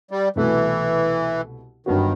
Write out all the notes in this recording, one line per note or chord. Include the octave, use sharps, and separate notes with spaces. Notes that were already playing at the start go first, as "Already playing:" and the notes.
G3
C2 B2 E3 A3
G1 G2 D#3 F#3 B3 F#4